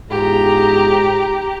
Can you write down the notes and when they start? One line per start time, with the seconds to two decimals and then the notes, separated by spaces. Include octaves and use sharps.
0.11 E2 G#2 F4 G4 G#4 A#5